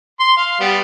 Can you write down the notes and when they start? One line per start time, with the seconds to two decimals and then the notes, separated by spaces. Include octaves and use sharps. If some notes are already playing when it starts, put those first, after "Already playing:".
0.20 C6
0.37 F5
0.60 G3 B3